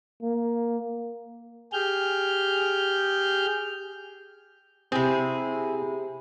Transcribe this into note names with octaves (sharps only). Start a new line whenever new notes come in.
A#3
G4 G#4 F6 G6
C3 C4 E4 G#4